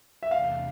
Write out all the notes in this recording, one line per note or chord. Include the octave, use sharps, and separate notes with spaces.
E5
E2 C3 E3 A3 D4 F5